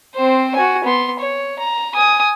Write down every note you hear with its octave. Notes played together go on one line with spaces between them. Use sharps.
C4 C5
F#4 G#5
B3 C6
C#5
A#5
G#5 D#6